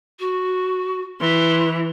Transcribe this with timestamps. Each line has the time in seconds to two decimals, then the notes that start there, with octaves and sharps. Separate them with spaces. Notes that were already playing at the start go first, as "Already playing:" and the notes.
0.20 F#4
1.20 E3 C6